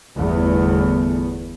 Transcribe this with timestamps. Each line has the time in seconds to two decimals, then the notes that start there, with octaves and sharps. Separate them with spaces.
0.18 G1 E2 A3 B3